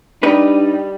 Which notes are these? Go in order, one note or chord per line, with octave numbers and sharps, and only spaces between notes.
G3 D4 D#4 B4